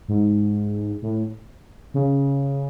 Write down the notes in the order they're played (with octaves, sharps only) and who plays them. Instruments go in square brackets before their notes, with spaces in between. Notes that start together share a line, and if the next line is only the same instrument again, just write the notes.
[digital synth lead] G#2
A2
C#3